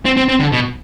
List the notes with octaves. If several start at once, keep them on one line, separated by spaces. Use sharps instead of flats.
C4
C4
C4
D3
B2